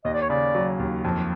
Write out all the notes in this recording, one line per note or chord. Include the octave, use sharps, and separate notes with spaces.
D#2 D#5
D5
C#5
C#3 D5
F#3
D#2
F2